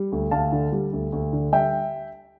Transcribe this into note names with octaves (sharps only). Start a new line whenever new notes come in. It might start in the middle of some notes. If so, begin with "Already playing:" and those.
Already playing: G3
D2
D2 F5 A5
D3
G3
D2
D2
D3
G3 E5 G5